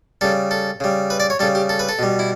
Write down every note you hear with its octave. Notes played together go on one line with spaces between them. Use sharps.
C#3 G3 A4
A4
C#3 G3
B4
D5
C#5
C#3 G3 A4
G4
A4
B4
A4
B2 G3
E4